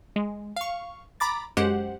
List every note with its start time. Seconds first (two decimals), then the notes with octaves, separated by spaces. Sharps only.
0.16 G#3
0.56 F5 C#6
1.20 A#5 B5 D6 A6
1.57 F#2 G#3 G4 C5 F#5